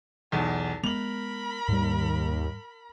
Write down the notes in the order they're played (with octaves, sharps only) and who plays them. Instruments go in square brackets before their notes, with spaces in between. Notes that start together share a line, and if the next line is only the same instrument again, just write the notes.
[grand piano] B1 E2 [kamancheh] A5
[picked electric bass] G#3 B3 [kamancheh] A#4 B5 [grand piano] F7 F#7
[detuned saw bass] D#2 [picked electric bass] G#2 G3